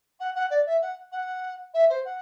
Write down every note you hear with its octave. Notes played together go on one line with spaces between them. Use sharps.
F#5
F#5
D5
E5
F#5
F#5
E5
C5
F#5